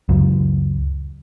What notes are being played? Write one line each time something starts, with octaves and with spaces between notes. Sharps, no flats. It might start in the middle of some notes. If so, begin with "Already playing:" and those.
C#2 F#2